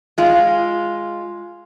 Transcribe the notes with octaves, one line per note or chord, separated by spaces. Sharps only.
G#3 F4